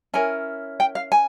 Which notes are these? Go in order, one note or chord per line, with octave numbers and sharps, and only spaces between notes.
C#4 E4 A#4 G#5
G5
F5
G#5